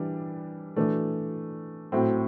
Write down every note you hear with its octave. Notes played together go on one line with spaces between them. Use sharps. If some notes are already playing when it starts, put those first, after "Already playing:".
Already playing: E3 G3 D4
E3 A3 D4
A2 F#3 C4